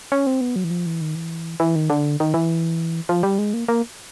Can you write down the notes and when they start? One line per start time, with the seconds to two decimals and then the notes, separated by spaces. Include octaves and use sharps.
0.12 C#4
0.27 C4
0.41 B3
0.56 F#3
0.64 E3
0.70 F3
0.86 E3
1.01 D#3
1.15 E3
1.60 E3
1.76 D#3
1.90 D3
2.20 D#3
2.34 E3
3.09 F3
3.23 G3
3.39 G#3
3.54 A#3
3.68 A#3